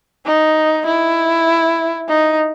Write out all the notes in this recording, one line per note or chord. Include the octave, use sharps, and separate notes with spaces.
D#4
E4
D#4